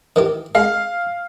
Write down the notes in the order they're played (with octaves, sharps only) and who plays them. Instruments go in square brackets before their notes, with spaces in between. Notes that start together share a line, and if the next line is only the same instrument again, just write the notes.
[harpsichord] D#3 E3 G4
[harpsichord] G#3 [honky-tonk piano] F5